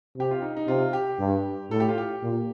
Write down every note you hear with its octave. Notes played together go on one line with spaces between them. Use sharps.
C3 G4
F4
D#4
D#4
C3 F4
G4
G2
A2 A4
G4
F4
G4
A#2